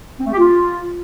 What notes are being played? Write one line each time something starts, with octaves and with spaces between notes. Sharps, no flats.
C4
A3
G4
F4